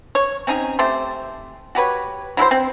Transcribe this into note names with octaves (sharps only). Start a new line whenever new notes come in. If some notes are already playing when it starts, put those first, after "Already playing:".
C#5
C4 C#4 D#4 G#4
A3 C4 G4 C5
F#4 G4 B4 C#5
F#3 E4 A4 C5
C4